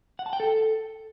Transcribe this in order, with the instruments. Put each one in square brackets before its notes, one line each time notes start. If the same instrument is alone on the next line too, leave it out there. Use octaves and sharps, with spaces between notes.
[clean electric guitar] F#5
A5
G5
A4